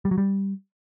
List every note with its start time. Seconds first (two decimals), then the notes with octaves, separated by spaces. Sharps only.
0.05 G3
0.11 F#3
0.18 G3